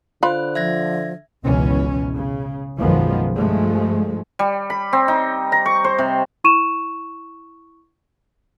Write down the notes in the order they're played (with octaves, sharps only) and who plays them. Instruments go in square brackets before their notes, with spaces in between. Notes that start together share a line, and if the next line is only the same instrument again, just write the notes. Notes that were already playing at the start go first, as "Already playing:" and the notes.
[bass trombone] D3 [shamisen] F4 B5 [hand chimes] C5 F#6
[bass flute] F3 [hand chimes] E5 G#6 A#6
[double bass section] G#1 C#2 B2 E3 C#4
C#3
B1 F#2 D#3 F3 G#3 B3
G2 F3 G#3 A3
[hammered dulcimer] G3
B5
C4
D#4
A#5
C#6
C5
C3
[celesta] E4 C#6 D#7 E7